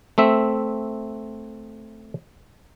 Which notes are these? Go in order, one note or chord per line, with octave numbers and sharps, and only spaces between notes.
A3 C4 E5